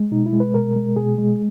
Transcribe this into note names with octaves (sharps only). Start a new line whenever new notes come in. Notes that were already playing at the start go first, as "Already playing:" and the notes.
Already playing: G#3
B2 D#4
E4
G#3
B4
B2 A#4
G#3
B2 G#4
G#3